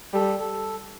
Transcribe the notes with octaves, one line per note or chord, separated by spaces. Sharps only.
G3 A4
A4